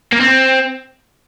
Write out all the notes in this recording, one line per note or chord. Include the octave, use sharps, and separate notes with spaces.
A#3
C4